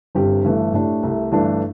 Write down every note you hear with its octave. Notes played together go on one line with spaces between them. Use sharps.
G1 G2 G3 C4 G4
G1 G2 E3 A3
A2 A3 D4 G4
C2 C3 A3
G1 G2 E3 A3 D4